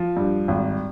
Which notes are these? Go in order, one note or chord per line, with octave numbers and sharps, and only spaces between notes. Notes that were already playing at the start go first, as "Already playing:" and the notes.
Already playing: F3
G2
G#1